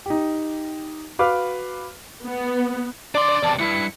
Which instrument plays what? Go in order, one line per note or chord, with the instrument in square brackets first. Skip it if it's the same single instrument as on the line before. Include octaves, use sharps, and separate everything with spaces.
[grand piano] D#4 G4
F#4 B4 F5 D6 F6
[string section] B3
[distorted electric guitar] D4 C6 [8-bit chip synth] D5 [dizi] D6
[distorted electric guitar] E2 C3 [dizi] A5
[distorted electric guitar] C2 G2 [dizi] E4 [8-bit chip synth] C#7